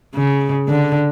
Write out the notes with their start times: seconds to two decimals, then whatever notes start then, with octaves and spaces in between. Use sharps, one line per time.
0.16 C#3
0.69 D3